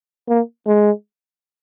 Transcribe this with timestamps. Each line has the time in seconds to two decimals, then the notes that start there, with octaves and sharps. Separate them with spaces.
0.28 A#3
0.67 G#3